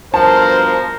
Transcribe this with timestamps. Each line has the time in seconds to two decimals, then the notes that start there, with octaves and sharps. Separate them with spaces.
0.14 G2 B2 F3 A#4 C5 A5